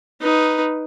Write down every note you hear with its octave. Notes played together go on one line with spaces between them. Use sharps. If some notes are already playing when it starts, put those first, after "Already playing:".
D#4 B4